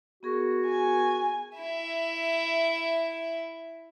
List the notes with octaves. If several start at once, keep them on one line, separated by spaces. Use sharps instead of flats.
B3 F#4 G#4 A#4
G#5
E4 E5